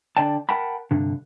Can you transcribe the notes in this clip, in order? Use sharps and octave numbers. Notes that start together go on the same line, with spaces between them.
D3 D5 G5 A5
A#4 F#5 G5 A5 B5
C2 G2 D3